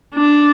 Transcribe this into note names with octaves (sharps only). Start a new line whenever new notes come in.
D4